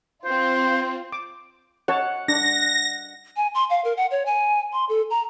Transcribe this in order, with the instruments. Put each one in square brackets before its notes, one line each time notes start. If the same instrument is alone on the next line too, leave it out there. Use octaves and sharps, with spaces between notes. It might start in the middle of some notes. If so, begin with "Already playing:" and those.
[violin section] C4 F4 [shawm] C5
[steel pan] D6
[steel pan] C#5 A5 [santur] F#5
[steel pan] D4 [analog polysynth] A#6
[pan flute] G#5
C6
F5
A#4
F#5
C#5
G#5
C6
A4
A#5